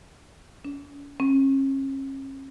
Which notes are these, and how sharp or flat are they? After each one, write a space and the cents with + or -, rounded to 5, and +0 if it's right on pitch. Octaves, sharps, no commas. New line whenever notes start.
C#4 +40
C#4 -40